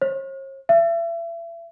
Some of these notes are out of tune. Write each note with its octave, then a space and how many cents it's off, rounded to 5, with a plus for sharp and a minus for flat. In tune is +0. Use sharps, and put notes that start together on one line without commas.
C#5 -45
E5 +35